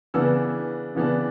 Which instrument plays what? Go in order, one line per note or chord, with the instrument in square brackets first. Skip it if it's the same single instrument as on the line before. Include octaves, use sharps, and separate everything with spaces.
[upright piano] C#3 E3 B3 D4 E6
C#3 E3 B3 D4